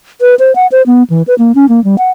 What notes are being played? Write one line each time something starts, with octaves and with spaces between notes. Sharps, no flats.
B4
C5
F#5
C5
B3
E3
B4
A#3
C#4
A#3
G3
F#5